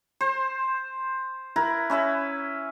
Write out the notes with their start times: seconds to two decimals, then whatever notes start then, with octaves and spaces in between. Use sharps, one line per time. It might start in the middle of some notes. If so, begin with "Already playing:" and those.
0.21 C5
1.56 E4 A#4 B4
1.90 C#4 B4 E5